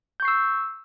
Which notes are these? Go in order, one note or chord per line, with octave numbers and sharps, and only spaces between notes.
C#6 E6 G6 C7